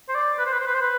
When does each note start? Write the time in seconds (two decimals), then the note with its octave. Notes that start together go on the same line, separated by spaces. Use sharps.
0.09 C5
0.15 D5
0.38 B4
0.46 C5
0.52 B4
0.60 C5
0.67 B4
0.74 C5
0.81 B4